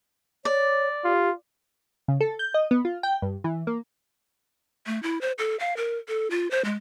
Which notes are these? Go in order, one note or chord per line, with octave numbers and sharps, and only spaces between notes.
C#5 D5
F4 G4
C#3
A4
G6
D#5
B3
F4
G5
G2
E3
A#3
A3
E4
C5
A4
F5
A#4
A4
F4
C5
G#3